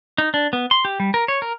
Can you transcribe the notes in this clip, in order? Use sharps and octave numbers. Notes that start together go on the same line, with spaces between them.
D#4
D4
B3
C6
G4
G3
A#4
C#5
A#4